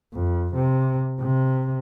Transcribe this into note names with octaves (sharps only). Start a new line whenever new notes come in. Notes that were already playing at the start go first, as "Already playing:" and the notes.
F2
C3
C3